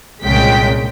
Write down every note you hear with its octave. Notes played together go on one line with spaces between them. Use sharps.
C2 A#2 C#3 G#3 G5 B6